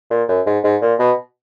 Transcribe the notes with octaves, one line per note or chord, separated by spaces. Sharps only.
A#2
F#2
G#2
G#2
A#2
B2